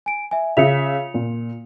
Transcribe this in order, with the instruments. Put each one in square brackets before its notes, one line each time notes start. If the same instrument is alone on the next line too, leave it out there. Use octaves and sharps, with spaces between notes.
[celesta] G#5 D7
E5 G#5
[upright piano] C#3 E5 [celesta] F4 C#7 F7
[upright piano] A#2